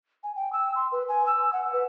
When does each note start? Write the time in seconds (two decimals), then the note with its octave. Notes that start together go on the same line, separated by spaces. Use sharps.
0.23 G#5
0.36 G5
0.53 E6
0.75 C6
0.92 B4
1.09 G#5
1.26 E6
1.53 F#5
1.73 B4